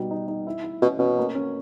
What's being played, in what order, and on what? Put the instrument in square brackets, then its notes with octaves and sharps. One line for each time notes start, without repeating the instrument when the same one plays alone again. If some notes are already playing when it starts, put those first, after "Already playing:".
Already playing: [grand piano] B2 G3 D#4
D#4
D#4
E4
E4
[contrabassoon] B2 [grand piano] C#4
[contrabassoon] B2 [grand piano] C#4
[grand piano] A#3
C#4